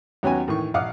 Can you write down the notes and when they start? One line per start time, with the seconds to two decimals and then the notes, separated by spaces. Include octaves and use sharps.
0.23 D#2 F#3 B3 C#4 F#4 G#5
0.48 A2 D#3 E3 C#6
0.74 A#1 F5 F#5 D6 D#6 F6